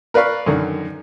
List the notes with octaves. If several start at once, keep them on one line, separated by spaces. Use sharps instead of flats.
A#4 B4 D5 F5 C#6
F#2 D3 D#3